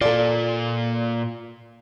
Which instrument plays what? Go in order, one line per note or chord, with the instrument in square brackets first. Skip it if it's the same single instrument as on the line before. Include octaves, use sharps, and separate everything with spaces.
[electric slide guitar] A#2 F4 [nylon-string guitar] A4 D5